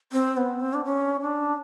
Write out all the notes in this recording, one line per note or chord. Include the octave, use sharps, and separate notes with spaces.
C4
B3
C4
D4
C#4
D4